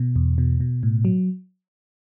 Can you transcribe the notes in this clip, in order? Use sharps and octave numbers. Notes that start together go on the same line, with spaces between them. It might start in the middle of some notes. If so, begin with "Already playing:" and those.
Already playing: B2
E2
B2
B2
A2
F#3